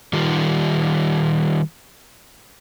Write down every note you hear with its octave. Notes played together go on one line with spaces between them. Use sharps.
D#3 G3 F4